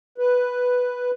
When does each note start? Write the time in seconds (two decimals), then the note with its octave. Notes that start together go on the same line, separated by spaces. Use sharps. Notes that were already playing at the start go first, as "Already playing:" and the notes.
0.18 B4